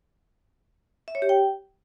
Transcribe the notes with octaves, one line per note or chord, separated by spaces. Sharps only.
E5
C#5
G4
G5